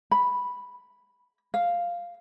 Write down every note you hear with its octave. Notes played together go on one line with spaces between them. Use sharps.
B5
F5